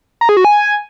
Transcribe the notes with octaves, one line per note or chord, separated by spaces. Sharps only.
A#5
G#4
F#4
G#5